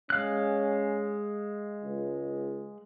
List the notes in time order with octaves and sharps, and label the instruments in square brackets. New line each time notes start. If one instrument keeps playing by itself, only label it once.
[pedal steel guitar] G#3 F5 F#6 [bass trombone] C#4
[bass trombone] C#2